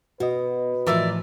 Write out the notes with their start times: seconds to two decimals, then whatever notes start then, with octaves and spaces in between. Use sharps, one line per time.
0.20 B2 F#4 B4 D#5
0.87 A2 E3 F3 A#4 D5 E5